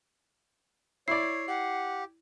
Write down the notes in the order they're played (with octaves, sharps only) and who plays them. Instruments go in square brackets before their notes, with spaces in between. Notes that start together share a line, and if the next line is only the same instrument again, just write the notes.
[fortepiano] E4 D5 [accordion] C#5 [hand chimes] C7
[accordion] G4 [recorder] F#5